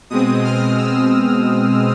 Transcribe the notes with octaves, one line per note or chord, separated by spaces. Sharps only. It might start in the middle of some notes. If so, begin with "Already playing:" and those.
B2 G#3 C4 D#6
F6
E6
E6